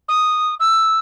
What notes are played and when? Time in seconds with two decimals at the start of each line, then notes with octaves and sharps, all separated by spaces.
0.08 D#6
0.59 E6